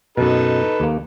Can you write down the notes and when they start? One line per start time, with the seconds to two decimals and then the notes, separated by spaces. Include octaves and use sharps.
0.17 F#2 B2 D#4 A4 B4
0.80 D#2 A#3